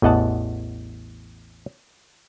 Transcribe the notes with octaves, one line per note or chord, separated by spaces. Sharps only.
A1 E2 D#5 F#5 A5